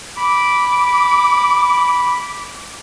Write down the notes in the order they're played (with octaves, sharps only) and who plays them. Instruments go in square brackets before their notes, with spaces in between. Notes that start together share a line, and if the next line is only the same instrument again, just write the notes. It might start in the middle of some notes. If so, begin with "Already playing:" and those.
[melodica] B5 [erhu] D6